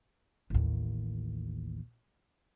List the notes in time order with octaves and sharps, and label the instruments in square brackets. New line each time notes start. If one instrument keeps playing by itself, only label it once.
[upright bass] A1 D#2